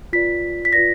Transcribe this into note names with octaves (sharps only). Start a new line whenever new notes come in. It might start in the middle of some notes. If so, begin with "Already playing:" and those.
F4 B4 D5 B6
B6
F4 B4 D5 A#6